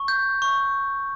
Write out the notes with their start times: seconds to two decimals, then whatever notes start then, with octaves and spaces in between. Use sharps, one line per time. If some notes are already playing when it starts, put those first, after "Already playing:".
Already playing: C#6
0.08 G6
0.42 C#6